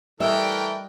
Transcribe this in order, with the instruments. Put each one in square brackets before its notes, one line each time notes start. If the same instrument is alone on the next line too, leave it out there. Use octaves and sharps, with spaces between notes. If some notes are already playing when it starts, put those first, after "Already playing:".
[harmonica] E3 A3 A#4 [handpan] G3 D#5 [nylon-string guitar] E5 [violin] G5